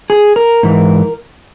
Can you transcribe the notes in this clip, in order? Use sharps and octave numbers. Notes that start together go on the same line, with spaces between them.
G#4
A#4
G#2 E3